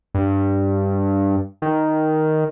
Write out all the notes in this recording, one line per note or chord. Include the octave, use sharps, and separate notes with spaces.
G2
D#3